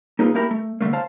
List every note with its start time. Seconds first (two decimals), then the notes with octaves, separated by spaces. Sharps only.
0.19 A#3 D#4 F4 G#4 B4
0.34 A3 A#3 E4 G4 A#4
0.51 A3
0.81 D3 F3 A3 A#3
0.93 C5 F5 A5